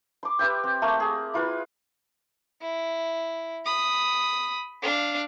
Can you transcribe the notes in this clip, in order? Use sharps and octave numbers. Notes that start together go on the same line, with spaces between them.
C6 D6
G4 B4 E5 G5
C4
A3 A#3 A4
G#4
E4 F4 B4
E4
B5 D#6
D4 F5